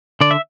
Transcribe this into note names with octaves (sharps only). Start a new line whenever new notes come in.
D3 D5
E5